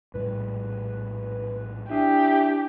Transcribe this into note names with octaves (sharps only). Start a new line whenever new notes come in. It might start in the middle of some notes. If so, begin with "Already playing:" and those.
A#1 A2 G3 B4
D4 E4 G4 E5